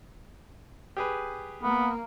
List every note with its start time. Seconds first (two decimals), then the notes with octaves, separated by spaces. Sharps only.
0.97 G4 G#4 B4
1.63 A#3 B3